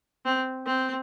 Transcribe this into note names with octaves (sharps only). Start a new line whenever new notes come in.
C4
C4